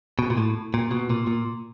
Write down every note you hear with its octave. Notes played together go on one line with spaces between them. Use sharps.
B2
A#2
A2
A#2
B2
A#2
A#2